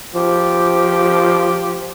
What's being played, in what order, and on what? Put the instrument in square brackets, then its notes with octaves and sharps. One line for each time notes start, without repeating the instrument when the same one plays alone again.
[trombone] F3 [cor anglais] G4